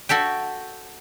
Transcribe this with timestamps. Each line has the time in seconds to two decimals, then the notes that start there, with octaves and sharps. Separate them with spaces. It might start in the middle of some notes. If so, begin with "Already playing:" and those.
0.09 F#4 A4 E5 G5